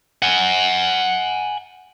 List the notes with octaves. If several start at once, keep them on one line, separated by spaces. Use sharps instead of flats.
F#5 G#5